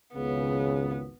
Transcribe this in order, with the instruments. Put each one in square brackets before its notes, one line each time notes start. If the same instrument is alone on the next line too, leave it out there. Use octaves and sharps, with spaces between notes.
[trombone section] G#1 C#2 C#3 [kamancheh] B3